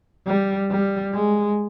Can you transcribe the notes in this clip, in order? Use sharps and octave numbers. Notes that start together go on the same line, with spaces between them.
G3
G3
G#3